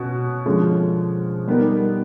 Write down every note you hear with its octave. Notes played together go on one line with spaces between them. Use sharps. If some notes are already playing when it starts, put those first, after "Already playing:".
Already playing: B2 C#4 F#4
D3 F3 G#3 C#4
G3 B3 D#4 G4 A#4